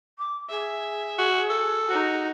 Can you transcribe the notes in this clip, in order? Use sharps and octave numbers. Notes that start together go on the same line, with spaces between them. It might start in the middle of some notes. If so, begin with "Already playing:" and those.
D6
G#4 E5
F#4
A4
D#4 F#4